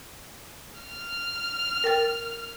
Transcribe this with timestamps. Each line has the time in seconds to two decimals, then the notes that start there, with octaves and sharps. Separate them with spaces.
0.80 F6
1.84 A#4 G5 A6